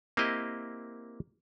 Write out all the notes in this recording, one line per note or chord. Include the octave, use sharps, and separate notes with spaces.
A#3 C4 E4 G4 D#5